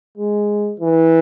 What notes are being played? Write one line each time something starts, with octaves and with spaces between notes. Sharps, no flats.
G#3
E3